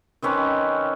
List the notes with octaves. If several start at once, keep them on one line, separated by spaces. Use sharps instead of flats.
D#3 C4 C#4 B4